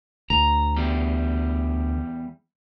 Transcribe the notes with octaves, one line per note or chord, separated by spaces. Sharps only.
D2 A#5
E2 G3